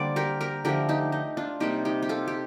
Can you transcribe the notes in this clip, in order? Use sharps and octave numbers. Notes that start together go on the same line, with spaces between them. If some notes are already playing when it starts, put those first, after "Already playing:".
Already playing: D3 G3 A#3 C5 D5
G4 A#4
G4 A#4
D3 F3 A3 G4 A#4
D#4 G4
D#4
D4 F4
C3 G3 A#3 D#4 G4
D#4 G4
G4
F4 A4
G4